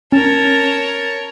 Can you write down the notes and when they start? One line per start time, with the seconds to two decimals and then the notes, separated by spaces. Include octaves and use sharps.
0.12 C#4 A#4 C#5 A5